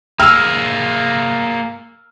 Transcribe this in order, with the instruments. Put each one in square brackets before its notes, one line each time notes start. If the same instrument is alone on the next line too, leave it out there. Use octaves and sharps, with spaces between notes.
[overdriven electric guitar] A#3 G#4 [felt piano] E6 F6